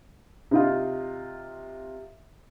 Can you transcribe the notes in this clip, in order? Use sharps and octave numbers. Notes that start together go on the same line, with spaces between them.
C3 D#4 F4